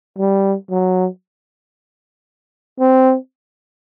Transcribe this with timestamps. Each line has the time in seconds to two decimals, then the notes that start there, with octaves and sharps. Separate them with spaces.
0.18 G3
0.70 F#3
2.79 C4